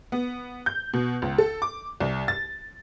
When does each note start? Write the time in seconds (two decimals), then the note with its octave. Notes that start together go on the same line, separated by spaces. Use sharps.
0.12 B3
0.66 G6
0.93 B2
1.22 C#2
1.38 A4
1.62 D6
2.00 C2
2.28 A6